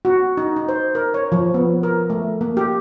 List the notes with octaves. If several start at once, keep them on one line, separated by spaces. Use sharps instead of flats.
F#4
D#4
D#4
C5
A#4
C#5
F3
B3
A#4
A3
A#3
G4